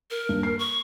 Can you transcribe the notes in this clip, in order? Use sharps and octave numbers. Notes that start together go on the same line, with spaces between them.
A#4
D#1 G2
C7
C#6